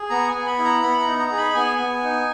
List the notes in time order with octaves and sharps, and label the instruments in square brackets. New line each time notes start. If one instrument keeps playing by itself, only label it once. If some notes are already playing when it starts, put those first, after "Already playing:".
Already playing: [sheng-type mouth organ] G#4
B3 A#5
G#5
B3
B5
E4
A#5
B3 B5
A#5
D#4
A#5
G#4
B5
B3 G#5
B3
D#4